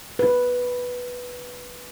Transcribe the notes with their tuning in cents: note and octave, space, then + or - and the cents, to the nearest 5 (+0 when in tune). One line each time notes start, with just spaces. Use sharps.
B4 -5